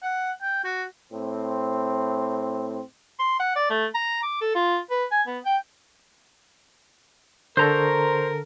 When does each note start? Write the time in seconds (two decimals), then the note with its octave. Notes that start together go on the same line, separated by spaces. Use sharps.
0.03 F#5
0.42 G5
0.64 F#4
1.12 A2 C4
3.19 C6
3.39 F#5
3.56 D5
3.70 A3
3.94 A#5
4.23 D6
4.41 A4
4.55 F4
4.90 B4
5.11 G#5
5.28 B3
5.45 G5
7.57 D3 A4 A#4 C5 A#5 C#6